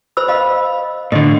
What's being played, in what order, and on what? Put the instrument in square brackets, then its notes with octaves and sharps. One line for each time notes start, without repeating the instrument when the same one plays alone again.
[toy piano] C5 B5 E6
D#5 F5 B5
[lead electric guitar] A2 D3 [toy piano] D#5